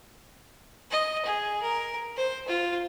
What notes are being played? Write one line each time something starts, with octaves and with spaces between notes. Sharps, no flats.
D#5
G#4
A#4
C5
F4